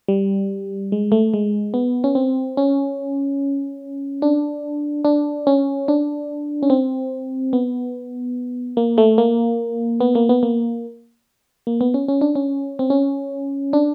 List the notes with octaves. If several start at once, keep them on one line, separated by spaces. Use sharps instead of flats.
G3
G#3
A3
G#3
B3
C#4
C4
C#4
D4
D4
C#4
D4
C#4
C4
B3
A#3
A3
A#3
B3
A#3
B3
A#3
A#3
B3
C#4
C#4
D4
C#4
C4
C#4
D4